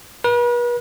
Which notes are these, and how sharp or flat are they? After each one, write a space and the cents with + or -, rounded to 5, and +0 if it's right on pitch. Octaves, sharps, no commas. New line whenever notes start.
B4 -40